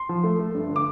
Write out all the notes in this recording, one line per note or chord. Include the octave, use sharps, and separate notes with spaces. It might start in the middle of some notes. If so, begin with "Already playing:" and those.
Already playing: C6
F3
A3
A3
G2
D3
D6